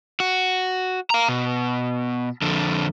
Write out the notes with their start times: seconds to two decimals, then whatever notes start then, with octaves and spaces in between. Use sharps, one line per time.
0.20 F#4
1.10 F5 A#5
1.28 B2
2.42 F2 D3